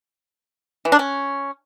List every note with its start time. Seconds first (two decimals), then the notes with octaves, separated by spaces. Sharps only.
0.85 E3
0.92 D4
0.99 C#4